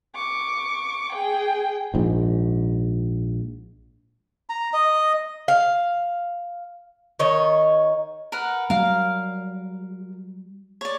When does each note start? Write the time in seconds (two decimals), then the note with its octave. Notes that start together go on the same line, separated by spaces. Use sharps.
0.15 C#6 D6
1.12 G#4 G5
1.94 A#1 G#2
4.49 A#5
4.73 D#5
5.48 F5
7.19 D#3 C#5 D#5
8.32 A#4 B4 F#5
8.70 F#3 G3 A#4 F5
10.81 C#5 D5